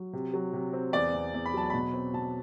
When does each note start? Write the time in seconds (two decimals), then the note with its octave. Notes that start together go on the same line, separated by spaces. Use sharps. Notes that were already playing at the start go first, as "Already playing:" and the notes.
Already playing: F#3
0.13 C3
0.34 F#3
0.53 C3
0.73 C4
0.93 E2 D5
1.13 E2
1.34 E2
1.46 B5
1.54 F#3 A5
1.70 B2 B5
1.93 C4
2.13 B2 A5